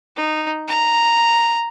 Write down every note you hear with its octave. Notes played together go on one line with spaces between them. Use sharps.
D#4
A#5